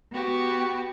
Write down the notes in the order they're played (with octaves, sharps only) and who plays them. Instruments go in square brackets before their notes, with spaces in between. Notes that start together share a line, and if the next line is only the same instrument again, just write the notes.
[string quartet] B3 F#4 G4